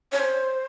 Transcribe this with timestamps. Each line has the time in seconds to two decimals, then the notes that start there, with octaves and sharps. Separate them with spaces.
0.12 C#5
0.20 C5